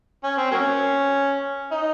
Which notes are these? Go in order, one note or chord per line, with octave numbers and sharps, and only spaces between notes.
C#4
C4
F#3 A#3 C#4
D#4